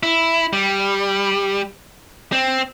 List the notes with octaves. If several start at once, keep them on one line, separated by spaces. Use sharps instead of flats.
E4
G3
C4